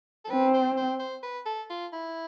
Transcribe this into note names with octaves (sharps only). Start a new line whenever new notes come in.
A4
C4 B4
C5
C5
C5
B4
A4
F4
E4